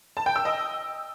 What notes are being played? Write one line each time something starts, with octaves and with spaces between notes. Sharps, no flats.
A5
G5
E6
D#5